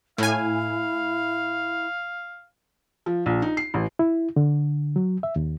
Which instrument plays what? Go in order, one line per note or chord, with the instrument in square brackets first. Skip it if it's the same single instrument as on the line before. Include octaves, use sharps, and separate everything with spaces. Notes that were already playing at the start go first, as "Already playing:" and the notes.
[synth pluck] A2 G#5 [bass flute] E4 [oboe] F5
[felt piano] F3
A#1
D#4
C7
A1
[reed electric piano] E4
D3
F#3
E5
D#2